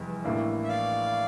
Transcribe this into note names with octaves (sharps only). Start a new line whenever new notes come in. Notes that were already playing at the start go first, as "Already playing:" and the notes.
Already playing: F1 E2 G3
A1 A2 E3 A#3 D4
E5
D5 F5